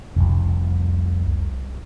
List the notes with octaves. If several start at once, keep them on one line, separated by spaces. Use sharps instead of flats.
F1 C2